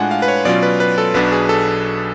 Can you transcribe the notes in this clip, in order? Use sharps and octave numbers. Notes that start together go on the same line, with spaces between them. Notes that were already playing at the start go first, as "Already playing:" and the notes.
Already playing: A2 G#3 D4 F4 F#5 G#5
F5
B4
C#5
B2 F#3 C#4 F4 D5
B4
B4
A4
B1 B2 F#3 B3 D4 B4
G#4
A4